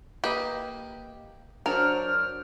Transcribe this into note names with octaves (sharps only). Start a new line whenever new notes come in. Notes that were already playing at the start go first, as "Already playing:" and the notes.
A#3 G4 B4 D#5
F#3 D4 A#4 C5 C#5 F6